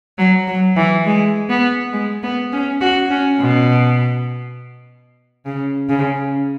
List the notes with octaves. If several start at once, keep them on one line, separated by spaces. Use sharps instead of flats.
F#3
F#3
E3
G#3
B3
G#3
B3
C#4
F#4
C#4
B2
C#3
C#3